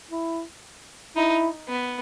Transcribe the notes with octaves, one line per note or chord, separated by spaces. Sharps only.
E4
D#4 E4
B3